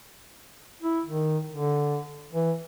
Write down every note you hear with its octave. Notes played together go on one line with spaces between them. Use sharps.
E4
D#3
D3
E3